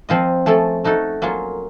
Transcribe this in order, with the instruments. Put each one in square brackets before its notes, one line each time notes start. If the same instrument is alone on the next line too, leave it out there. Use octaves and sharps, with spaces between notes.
[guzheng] F3 C4 F4 C5 D#5
F3 A3 C#4 A4
A3 D#4 F#4 A4
F#3 A#3 C#4 F4